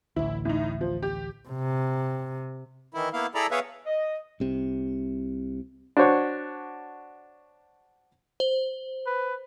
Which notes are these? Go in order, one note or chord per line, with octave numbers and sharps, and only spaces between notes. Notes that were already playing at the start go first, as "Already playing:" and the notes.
A1 D2 E4
A2 D#4
F3
G4
C3
D#3 E3 E4
A#3 B3 E4 F5
E4 G#4 A4 D5 A#5 B5
B3 G#4 B4 C#5 E5 F5
D#5
C2 C3
D4 F#4 C5 C#5
C5
B4